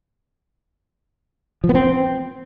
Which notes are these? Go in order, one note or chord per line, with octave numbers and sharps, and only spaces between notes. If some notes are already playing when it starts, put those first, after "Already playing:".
F3
B3
C4